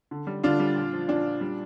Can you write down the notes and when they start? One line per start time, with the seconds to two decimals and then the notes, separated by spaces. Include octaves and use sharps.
0.11 D3
0.27 G3
0.44 D3 D4 F4
0.60 G3
0.76 A#2
0.93 F3
1.08 A#2 D4
1.25 A#2
1.41 G3